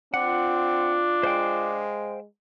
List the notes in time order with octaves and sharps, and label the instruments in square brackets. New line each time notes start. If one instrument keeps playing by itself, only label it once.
[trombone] C4 [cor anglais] D4 [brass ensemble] F4 [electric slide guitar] F#5
[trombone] G#3 [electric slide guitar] C5 F5 G5